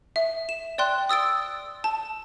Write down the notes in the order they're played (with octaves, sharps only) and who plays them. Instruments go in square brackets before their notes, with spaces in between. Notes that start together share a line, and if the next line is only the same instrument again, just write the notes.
[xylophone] E5
E7
D5 G5 C6 F#6
D#6 E6 A6 D7
A5